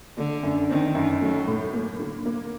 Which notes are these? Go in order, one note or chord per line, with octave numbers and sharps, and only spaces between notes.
D3 A3
F#2
D#3 C4
F#2
F#3 A3
A2
A#3
D3
A#3